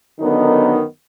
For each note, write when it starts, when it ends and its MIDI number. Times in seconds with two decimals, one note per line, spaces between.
0.20 0.82 42
0.20 0.82 50
0.20 0.82 51
0.20 0.82 59
0.20 0.82 63